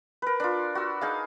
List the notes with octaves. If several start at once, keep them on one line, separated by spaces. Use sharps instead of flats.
A#4 B4
D4 F4
F#4 E6
D#4 G#4 F5